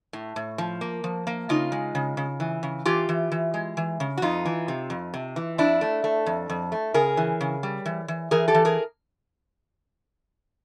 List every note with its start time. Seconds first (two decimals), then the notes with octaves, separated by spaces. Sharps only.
0.13 A2
0.36 A2
0.58 F3
0.81 A#3
1.04 F3
1.27 A#3
1.49 C#3 D#4 F4
1.72 G#3
1.95 C#3
2.17 C#3
2.40 E3
2.63 C#3
2.85 E3 F4 G4
3.09 E3
3.32 E3
3.54 G#3
3.77 E3
4.00 C#3
4.18 F#4
4.22 F2 D#4 F4
4.46 E3
4.68 C3
4.90 F2
5.14 C3
5.36 E3
5.58 F2 D4 E4
5.81 A3
6.04 A3
6.26 F2
6.50 F2
6.72 A3
6.94 C#3 G#4 A#4
7.17 E3
7.41 C#3
7.63 G3
7.86 E3
8.08 E3
8.31 E3 G#4 A#4
8.48 G4 A4
8.55 E3
8.65 G#4 A#4